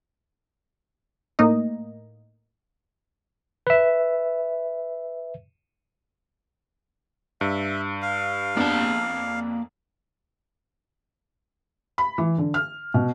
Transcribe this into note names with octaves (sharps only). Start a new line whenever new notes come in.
A2 A#3 D#4 D#5
B4 E5
G2 E5
F5
F2 A#3 B3 D4 A5
B5
E3
D3
F6
B2